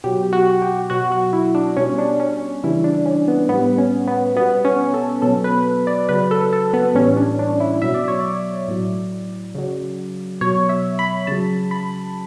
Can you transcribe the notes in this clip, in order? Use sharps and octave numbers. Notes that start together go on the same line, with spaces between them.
B2 F#3 G4
F#4
G4
B2 F#3 F#4
F#4
E4
D4
B2 G3 C#4
D4
C#4
C#3 E3 G3 E4
D4
C#4
B3
A2 G3 B3
C#4
B3
B2 G3 B3
C#4
A4
B2 F#3 A4
B4
D5
C#3 F#3 B4
A4
A4
B3
A2 E3 G3 C#4
D4
D4
E4
B2 F#3 E5
D5
C#5
D5
A2 F#3
C#3 F#3
B2 F#3 C#5
E5
B5
C#3 F#3 A5
B5